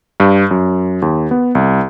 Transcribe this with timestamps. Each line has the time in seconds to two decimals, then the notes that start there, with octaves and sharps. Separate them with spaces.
0.20 G2
0.51 F#2
1.02 D#2
1.31 B3
1.55 C2